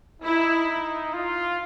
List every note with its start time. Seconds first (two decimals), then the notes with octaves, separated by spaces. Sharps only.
0.22 D#4 E4
1.13 F4